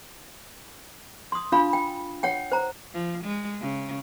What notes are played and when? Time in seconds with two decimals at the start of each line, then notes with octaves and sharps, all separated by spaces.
1.32 C6 D#6
1.52 D4 F4 F5 B5
1.73 G5
2.23 C#5 F#5 G5
2.52 C5 A#5
2.94 F3
3.24 G#3
3.60 C#3